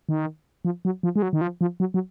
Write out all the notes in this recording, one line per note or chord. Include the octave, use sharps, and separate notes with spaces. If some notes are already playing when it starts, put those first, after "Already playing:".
D#3
F3
F#3
F3
G#3
F#3
D#3
F3
F3
F#3
F#3